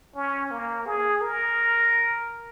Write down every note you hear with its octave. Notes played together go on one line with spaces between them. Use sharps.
C#4
A#3
G#4
A#4